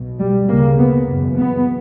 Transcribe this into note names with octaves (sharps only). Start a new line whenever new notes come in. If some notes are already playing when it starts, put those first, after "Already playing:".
Already playing: B1 B2
G3
D2 C#3 A#3
B3
F#1 E2 B2
B3